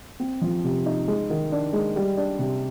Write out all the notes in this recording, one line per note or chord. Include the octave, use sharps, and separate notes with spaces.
C4
F3
C3
D#4
G#3
D#3
D4
G#3
G3
D4
C3